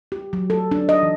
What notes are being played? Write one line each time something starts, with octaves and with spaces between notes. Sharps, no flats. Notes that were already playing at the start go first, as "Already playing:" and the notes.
G4
F#3
A4
D4
D#5
E3